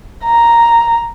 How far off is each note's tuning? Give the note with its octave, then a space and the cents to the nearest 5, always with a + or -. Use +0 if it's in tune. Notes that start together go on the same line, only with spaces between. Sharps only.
A#5 +0